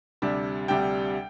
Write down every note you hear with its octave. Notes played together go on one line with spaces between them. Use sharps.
D2 C3 G3 D4
D2 C3 G3 D4 G5